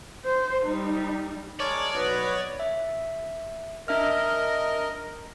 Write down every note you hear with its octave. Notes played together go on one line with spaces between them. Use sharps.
C5
G3 D#4
G#3 A#4 C#5 D5 A5
B1 F#4 B4 D#5
E5
D4 A#4 D#5 E5 F6